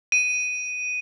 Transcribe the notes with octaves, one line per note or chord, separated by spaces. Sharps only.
D#7